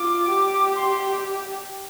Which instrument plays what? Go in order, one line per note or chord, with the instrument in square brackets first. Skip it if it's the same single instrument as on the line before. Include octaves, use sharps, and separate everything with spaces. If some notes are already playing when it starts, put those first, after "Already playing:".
Already playing: [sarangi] F4 [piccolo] D6
[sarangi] G4
[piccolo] C6